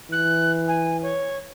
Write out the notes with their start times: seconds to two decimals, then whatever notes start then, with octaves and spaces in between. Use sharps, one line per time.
0.12 E3 F#6
0.67 G#5
1.02 C#5